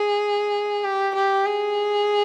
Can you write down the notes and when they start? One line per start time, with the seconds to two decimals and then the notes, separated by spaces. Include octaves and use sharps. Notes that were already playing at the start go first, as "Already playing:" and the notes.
Already playing: G#4
0.84 G4
1.15 G4
1.46 G#4